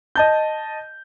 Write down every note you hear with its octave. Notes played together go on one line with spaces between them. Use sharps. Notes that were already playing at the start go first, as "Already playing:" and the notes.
D#5 A5 G6